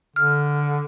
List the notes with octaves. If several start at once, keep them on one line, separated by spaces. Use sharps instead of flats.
D3 F6